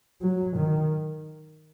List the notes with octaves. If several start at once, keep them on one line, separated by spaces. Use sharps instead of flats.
F#3
D#3